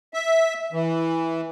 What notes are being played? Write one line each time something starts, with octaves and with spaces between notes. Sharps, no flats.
E5
E3